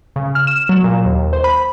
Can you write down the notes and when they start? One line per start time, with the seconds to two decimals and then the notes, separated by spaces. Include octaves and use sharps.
0.16 C#3
0.35 F6
0.47 E7
0.69 F#3
0.84 A#2
1.05 D#2
1.33 C5
1.44 B5